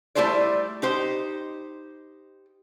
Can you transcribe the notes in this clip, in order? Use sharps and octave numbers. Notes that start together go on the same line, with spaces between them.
G3 A3 E4 G#4 C5 D5
D#4 G4 C5